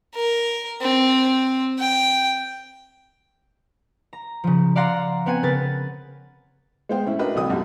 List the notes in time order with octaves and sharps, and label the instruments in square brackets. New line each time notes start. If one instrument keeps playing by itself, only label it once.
[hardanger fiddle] A#4
C4
G5
[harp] A#5
C#3 F3
D5 F5 F#5 A#5 C6
B3 C4 F#5 G#5
C#3 A#4 B4 A6
[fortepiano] G#3 B3 C5 F5 G5
A2 C#4 E4
D4 F#4 A#4 B4 D#5
C2 D3 F#3 D#5 G5 D#6
B1 F#2 A2 G4